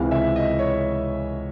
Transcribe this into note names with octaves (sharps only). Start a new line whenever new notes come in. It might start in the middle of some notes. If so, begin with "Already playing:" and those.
Already playing: C#2 C3 E3 G#3 F5
E5
D#5
C#5